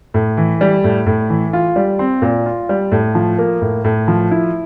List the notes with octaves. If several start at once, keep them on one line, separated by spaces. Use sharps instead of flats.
A2
E3
G3
A2
A2
E3
F4
G3
C4
A#2
F4
G3
A2
F3
A#3
A2
A2
F3
E4